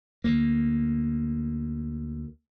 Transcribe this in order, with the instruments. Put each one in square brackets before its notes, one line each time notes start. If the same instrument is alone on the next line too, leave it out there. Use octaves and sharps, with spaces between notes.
[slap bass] D2 A#3